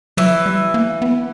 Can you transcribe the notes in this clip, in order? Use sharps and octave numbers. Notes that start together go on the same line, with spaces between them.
E3 F#3
G3
A#3
B3